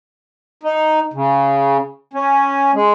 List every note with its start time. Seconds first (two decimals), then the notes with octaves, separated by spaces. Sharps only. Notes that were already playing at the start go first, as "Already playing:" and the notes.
0.63 D#4
1.13 C#3
2.13 C#4
2.74 G#3